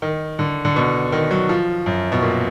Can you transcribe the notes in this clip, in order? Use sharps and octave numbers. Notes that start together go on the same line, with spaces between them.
D#3
D3
D3
B2
D#3
F#3
F3
F#2
B2
A#2